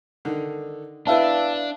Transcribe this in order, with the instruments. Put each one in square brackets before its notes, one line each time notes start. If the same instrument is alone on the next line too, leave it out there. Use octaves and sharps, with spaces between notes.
[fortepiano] D3 D#3
[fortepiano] B3 E4 B4 [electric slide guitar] D4 [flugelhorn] E5 [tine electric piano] F5 A5